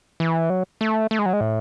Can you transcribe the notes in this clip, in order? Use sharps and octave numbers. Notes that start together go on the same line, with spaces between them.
E3
F#3
A3
A3
G#3
F#3
G#3
A2